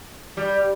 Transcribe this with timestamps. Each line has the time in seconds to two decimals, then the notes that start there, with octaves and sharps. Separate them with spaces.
0.37 G3